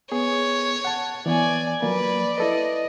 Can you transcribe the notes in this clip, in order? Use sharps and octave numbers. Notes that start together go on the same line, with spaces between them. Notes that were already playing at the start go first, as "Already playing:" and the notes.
B3 G#4 C#5
F#5 A5
E3 B3 D5 G#5
F3 F#3 A#3 B4 D5
E4 A4 B4 D#5